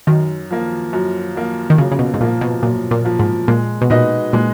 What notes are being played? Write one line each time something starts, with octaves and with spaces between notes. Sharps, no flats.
F#2 D#3
F3 A#3
F#2
F3 A#3
D#3
F#2 C#3
C#3
B2
G#2
A#2 F3 A#3
B2
F#2 A#2
A#2
F3 A#3
G#2
A#2 G#3
B2
A#2 D#4 F#4 B4 D#5
A#2 G#3